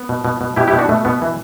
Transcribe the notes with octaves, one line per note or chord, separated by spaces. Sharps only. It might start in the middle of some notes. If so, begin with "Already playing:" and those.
Already playing: B3
B2
B2
B2
B2 E4 G4
E4 G4
B2
D4 F#4
B2 A3
B2 B3
E3